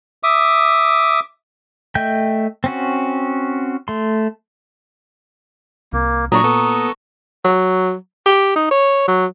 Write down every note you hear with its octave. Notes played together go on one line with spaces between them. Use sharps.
E5 D6 D#6
A3 D#5 E5 G5 G6
C4 C#4 F#4
A3 C6
C2 A#3
A#2 F#3 D4 A#5 C#6 D#6
B3 A4
F#3
G4
D#4
C#5
F#3